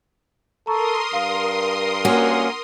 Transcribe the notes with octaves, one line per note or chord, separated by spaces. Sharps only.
A4 A#4 A#5 C6 C#6 D#6
G2 F5
A#3 C#4 F#4 F#5